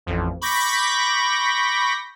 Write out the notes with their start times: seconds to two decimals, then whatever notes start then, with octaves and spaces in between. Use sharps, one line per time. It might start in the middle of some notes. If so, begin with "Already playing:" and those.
0.06 A1 F2
0.41 B5 C#6 D6 G6 A#6 B6